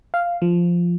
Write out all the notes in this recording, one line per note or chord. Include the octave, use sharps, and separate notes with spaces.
F5
F3